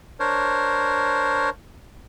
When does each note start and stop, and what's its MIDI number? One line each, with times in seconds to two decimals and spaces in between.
0.20 1.50 62
0.20 1.50 70
0.20 1.50 72
0.20 1.50 73